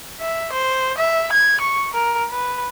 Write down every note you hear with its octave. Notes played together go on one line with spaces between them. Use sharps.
E5
C5
E5
G#6
C#6
A#4
B4